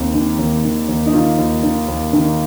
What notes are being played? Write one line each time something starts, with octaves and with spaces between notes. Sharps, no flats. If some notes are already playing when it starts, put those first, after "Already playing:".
Already playing: D#2 D#3 C4
D#3
D#2
D#3
D#2
D#4
D#3 F4
D#2
D#3
D#2
D#3